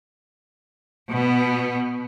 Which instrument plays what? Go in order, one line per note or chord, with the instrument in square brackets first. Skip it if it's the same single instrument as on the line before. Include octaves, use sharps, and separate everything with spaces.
[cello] B2 B3